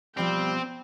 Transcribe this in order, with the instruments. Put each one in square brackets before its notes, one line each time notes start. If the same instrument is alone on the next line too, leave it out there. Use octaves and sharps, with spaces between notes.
[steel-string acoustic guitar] B2 F3 F4 [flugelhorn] G3 [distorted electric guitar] C4 [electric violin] G5